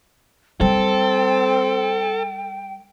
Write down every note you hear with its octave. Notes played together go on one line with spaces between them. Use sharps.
G3 C4 A4 G5